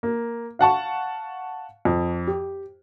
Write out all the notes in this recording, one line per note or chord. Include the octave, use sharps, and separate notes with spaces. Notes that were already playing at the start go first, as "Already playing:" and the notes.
A#3
F5 F#5 A5 C#6
F2
G4